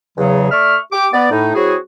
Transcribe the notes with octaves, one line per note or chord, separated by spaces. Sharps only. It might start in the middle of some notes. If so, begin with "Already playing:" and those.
E2 C#3 F#3
A3 D5 E5 C#6 F6
G4 D6
B3 D5
A2 D#4
F#3 C4 E4 F#4 G#4